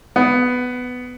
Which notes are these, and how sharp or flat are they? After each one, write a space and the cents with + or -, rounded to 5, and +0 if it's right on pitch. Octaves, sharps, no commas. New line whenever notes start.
B3 +10